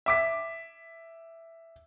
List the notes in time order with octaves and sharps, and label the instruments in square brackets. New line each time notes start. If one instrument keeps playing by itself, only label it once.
[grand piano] E5 D6 B6